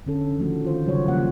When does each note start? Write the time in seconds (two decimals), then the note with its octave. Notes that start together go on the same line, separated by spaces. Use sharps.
0.06 D3 C#4 A4
0.38 D#3 F3 A3 F#4
0.63 D#3 F4 C5
0.86 C#3 F#3 G3 F#4 C#5
1.08 F3 G3 A#3 A#4 F#5